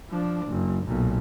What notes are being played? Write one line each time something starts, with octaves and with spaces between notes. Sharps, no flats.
F3 D4
F#1
B1 A#2